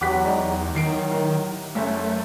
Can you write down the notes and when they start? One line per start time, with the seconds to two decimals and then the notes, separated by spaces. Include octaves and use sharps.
0.01 E2 F#3 B3 F#4 G4 D6 F#6 B6
0.24 G#3 D#4 D5 A#5
0.75 E2 D#3 F#3 C7 D7
1.11 A2 A#4
1.75 F#1 F#3 A3 C#4 E5